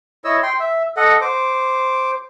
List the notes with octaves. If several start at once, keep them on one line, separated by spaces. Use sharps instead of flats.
E4 C#5 D#5 E6
G5 C6
E5
A4 D#5 F#5
C5 D6